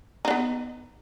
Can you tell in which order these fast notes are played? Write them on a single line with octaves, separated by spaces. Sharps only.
D#4 D4 B3